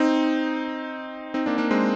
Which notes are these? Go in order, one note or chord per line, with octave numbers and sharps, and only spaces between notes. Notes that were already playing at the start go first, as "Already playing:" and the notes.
Already playing: C4 D#4
C4 D#4
A#3 D4
A#3 D4
G#3 C4